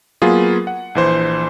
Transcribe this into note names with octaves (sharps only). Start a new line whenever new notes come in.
F#3 A#3 B3 F4 G#4
F#5
A#1 E3 C5